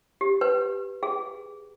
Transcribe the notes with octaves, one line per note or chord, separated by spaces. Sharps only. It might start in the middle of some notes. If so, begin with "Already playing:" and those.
G4
B4
G#4